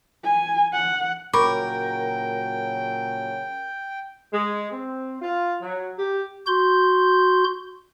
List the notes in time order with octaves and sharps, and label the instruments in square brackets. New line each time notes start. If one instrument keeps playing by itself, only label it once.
[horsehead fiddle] G#5
F#5
[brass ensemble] A#2 C#3 F#3 [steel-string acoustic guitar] A#4 [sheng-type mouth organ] G5 [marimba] B5 C#6 D6
[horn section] G#3
C4
F4
F#3
G4
[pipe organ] F#4 C6 G6